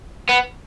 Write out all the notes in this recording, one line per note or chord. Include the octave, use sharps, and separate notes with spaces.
B3